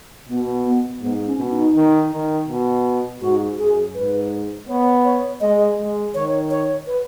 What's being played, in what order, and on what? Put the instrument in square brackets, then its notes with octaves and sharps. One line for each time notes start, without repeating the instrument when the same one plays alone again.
[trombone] B2 [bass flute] B3
[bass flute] B3
[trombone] G#2 [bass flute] B3
[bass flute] C#4
[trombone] B2
[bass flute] D#4
[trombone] D#3
D#3
B2
[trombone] G#2 [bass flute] F#4
[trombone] F#2 [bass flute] G#4
[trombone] G#2 [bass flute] B4
[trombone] B3 [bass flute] C#5
[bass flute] C#5
[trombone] G#3 [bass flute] D#5
[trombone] G#3
[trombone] D#3 [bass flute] C#5
[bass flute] C#5
B4